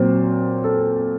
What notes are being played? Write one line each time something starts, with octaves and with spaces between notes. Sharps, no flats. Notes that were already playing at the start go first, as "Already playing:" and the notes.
Already playing: A#2 F#3 C4 C5
A4